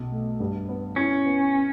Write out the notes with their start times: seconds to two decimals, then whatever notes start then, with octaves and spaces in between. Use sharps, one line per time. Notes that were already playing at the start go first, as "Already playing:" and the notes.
Already playing: B1
0.11 A3
0.40 G2
0.69 B3
0.96 C#4 E4
1.26 B3